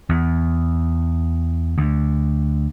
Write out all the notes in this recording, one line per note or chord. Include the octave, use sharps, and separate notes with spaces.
E2
D2